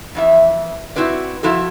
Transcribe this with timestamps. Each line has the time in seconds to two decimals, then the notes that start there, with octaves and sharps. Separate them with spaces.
0.15 F2 E3 E5
0.96 C4 E4 F#4 B4 D5
1.43 F3 E4 F#4 A4